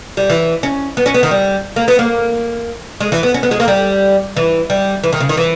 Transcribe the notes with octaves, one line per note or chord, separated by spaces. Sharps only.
G3
E3
C#4
B3
C#4
B3
D#3
G3
A#3
B3
A#3
G#3
E3
B3
C#4
B3
G#3
A#3
G3
E3
G3
E3
D#3
C#3
D#3
E3